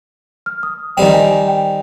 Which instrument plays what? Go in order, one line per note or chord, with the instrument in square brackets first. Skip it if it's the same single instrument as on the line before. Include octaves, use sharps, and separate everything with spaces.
[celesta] F6
D#6
[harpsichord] D#3 G3 C4 [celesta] G5
[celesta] G#5
G#5
G5